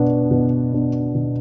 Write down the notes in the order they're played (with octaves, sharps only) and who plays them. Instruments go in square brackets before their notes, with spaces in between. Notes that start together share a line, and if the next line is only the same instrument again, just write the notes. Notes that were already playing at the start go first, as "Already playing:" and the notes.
Already playing: [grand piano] B2 B3 D4
B2
B3 D4
B2